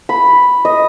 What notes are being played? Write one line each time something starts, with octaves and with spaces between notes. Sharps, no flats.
B5
D#5